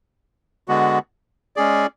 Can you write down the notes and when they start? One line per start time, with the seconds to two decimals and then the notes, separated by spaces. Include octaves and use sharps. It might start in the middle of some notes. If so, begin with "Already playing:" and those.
0.68 D3 G#3 B3 F#4
1.56 G#3 C#4 G#4 D5